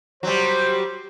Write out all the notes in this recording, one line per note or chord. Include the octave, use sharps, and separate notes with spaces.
F#3 G3 C5